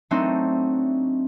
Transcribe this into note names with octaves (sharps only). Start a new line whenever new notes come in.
F#3 A3 C4 D4 D#4